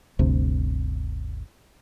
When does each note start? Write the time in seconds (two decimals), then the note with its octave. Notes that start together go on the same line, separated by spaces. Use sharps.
0.19 G1 D2 C3